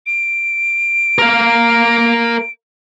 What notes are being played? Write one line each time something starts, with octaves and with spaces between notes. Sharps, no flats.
D7
A#4 F5